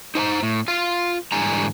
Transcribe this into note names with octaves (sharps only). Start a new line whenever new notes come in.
D#4 C5 G#5 A#5
A2
F4 F5
G#2 D3 E3 G3 G#5 A#5